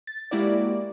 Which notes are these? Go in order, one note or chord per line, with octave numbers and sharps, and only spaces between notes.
A6
G#3 A#3 E4 F#4 G4 D5